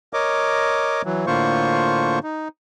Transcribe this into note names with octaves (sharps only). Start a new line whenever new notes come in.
A#4 C#5 D#5 D6
E3 F#3
A2 D3 A#3 F4 C5 C#6
D#4